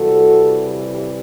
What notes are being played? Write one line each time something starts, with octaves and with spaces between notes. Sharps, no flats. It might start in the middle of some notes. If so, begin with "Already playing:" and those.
Already playing: C3 E3 G3 F#4 A4